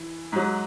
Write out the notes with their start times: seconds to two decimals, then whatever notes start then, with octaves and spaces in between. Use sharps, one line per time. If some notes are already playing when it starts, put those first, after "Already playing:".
Already playing: E3
0.32 G#2 F#3